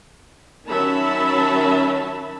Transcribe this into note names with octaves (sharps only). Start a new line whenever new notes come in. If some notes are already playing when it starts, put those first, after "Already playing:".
D#3 F#3 C#4 E5 A5 B5